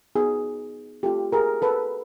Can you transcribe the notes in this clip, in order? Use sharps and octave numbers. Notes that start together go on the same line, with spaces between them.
B3 D#4 F#4 G#4
A3 C4 F4 G4 A4
G#4 A#4
A4 B4